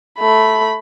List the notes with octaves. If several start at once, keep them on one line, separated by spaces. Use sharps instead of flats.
A3 B5